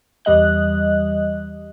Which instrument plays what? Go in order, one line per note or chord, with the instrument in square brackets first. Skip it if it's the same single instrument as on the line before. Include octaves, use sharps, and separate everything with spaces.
[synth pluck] E2 G3 D#5 F#6